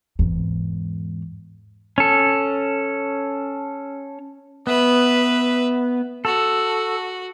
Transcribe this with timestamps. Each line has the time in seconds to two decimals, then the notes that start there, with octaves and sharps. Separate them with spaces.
0.19 E2 G#2
1.98 C#4 A4
4.67 B3 B4 E5
6.25 F#4 A4